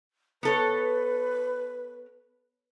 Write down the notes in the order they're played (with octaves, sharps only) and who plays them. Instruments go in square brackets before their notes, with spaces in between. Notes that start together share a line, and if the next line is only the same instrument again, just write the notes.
[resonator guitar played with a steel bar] B3 A4 C#5 [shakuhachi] B4